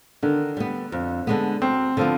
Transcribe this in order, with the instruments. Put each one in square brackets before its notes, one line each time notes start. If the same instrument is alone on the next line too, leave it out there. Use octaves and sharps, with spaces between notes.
[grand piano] D3 [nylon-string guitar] D#3
[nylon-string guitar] G3 B3
F2
D3 G#3 B3
[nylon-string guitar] D2 [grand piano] C4
[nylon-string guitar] D3 F3 B3